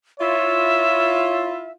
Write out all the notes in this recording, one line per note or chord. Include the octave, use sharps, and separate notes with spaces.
E4 F4 C#5 E5